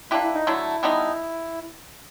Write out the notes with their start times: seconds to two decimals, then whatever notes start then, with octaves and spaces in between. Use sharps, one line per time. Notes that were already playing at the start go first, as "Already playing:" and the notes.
0.11 A#3 D4 E4 G4 B4
0.23 E4
0.35 D#4
0.47 D3 F#3 A3 E4
0.83 D3 G3 B3 D#4